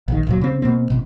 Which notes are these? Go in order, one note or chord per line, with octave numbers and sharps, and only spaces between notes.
A#1 D#3
D1 A#2 F#3
C#3 C4
B2 A#3 C4
A1 B2